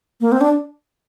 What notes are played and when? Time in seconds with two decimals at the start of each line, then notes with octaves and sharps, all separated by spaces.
0.21 A#3
0.32 C4
0.41 D4